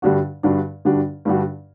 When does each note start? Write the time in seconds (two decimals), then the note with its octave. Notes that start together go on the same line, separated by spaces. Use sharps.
0.02 G2 D3 G3 D4 F#4
0.43 G2 D3 G3 D4 F#4
0.85 G2 D3 G3 D4 F#4
1.25 G2 D3 G3 D4 F#4